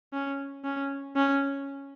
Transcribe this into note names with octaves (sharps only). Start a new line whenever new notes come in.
C#4
C#4
C#4